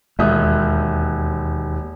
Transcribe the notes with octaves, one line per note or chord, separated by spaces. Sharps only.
E1 D#2 E5 D#6